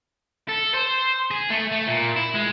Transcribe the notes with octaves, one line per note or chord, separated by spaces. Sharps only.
A4
C5
G#4
A3
A3
A#2
E4
G#3